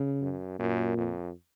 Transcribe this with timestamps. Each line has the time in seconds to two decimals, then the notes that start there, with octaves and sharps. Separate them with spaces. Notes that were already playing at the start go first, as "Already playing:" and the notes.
Already playing: C#3
0.21 F#2
0.59 F#2 A#2
0.97 F2